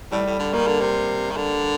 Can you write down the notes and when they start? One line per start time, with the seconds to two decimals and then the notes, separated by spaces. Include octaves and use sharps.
0.12 A2 G3
0.26 A2
0.39 D3
0.53 D#3 A#3
0.67 D3
0.81 C3
1.31 D#3
1.37 D3